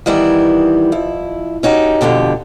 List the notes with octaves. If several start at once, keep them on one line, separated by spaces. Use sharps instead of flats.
D#3 E3 G3 B3 E4
F2 E4
C#4 D#4 F#4 G4
F2 G#2 B2 D3 G4